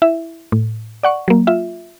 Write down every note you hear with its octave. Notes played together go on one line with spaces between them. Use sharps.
E4 E5
A2
D5 F#5 C#6
F#3 A#3
F4 E5